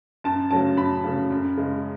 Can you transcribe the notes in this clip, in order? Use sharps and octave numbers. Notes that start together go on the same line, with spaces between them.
F#2 A5
C#3 F#3 A3 A5
F#2 B5
C#3 F#3 A3
F#2
C#3 G#3